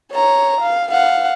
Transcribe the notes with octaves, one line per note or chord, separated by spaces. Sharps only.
C#5 A#5
F5
F5 F#5